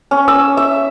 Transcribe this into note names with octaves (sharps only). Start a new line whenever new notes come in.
C#4
E6
E5